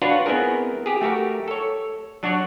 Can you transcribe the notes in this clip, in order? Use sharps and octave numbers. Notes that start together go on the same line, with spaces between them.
D4 F4 F#4 B4 C#5
B3 C4 E4 G#4 A#4
G4 G#4
A3 F#4 G4 A#4
A4 C#5
F#3 D4 F#4 C#5 D5